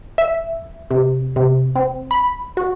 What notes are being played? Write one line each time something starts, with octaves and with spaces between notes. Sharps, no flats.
E5
C3
C3
C4
B5
F#4